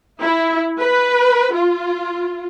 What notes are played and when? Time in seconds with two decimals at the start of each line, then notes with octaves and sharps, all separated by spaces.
0.22 E4
0.80 B4
1.54 F4